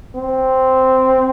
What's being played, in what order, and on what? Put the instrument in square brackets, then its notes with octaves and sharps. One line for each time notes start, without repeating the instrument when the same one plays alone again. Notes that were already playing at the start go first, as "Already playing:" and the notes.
[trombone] C4